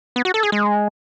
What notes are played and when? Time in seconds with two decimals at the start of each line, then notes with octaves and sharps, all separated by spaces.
0.16 B3
0.25 F#4
0.34 A4
0.43 G#4
0.52 G#3